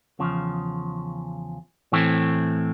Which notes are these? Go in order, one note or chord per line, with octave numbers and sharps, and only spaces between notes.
E2 C#3 F3
A2 E3 A3 C4